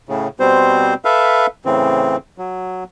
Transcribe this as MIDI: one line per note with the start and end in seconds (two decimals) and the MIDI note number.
0.09 0.28 45
0.09 0.28 49
0.40 0.94 47
0.40 0.94 55
0.40 0.94 60
0.40 0.94 72
1.05 1.46 69
1.05 1.46 71
1.05 1.46 76
1.05 1.46 77
1.65 2.16 45
1.65 2.16 49
1.65 2.16 52
1.65 2.16 60
2.38 2.84 54